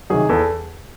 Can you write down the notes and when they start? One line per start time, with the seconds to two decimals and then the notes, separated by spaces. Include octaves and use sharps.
0.10 C3 D#3 F#3 G#4
0.29 E2 A4